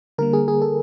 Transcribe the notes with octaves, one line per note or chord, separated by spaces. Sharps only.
D3 G3 A#3 A#4
G#4
G#4
A4